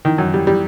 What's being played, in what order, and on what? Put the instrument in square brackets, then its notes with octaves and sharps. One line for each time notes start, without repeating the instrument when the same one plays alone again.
[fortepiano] D#3
F#2
G3
G3